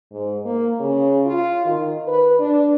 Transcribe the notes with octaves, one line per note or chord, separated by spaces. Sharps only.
G#2
A#3
C#3
F4
D#3
B4
D4